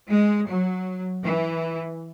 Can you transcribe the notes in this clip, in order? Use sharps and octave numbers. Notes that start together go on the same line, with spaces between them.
G#3
F#3
E3